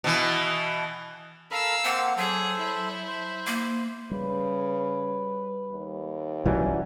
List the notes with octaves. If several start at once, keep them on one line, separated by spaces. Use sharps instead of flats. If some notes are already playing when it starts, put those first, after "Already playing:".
B2 E3
A4 A#4 F5 B5 E6
A#3 C4 C5 F#5
F#3 G#4 A4 C5
E4
C5
A#3
C#3 G3 B4
D#2
B1 E3 F#3 G3 C#4